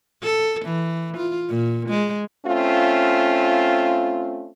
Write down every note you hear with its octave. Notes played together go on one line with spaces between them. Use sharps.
A4
E3
F4
A#2
G#3
A3 C4 C#4 F4